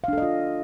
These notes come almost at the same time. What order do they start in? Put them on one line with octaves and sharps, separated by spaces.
F5 D4 A4 D#5 F4